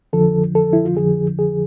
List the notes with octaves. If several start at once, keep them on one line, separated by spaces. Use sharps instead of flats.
F2 D3 F3 A4
A4
E4
F4
F2 D3 F3 G#4
G#4